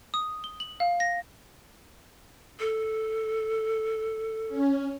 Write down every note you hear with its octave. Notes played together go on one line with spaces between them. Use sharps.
D#6
G7
F#7
F5
A#6
A4
C#4